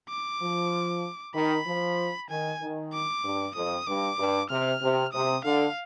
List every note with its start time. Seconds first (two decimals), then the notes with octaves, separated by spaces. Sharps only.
0.09 D6
0.41 F3
1.35 D#3 B5
1.67 F3
2.30 D#3 G#5
2.61 D#3
2.93 D6
3.25 G2
3.56 F2 D#6
3.87 G2 D6
4.18 G2
4.50 C3 F6
4.82 C3
5.13 C3 D#6
5.45 D3 F5